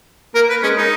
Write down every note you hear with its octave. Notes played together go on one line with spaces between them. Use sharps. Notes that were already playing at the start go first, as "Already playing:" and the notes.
A#3 A#4
B4
G#3 C#4
D#4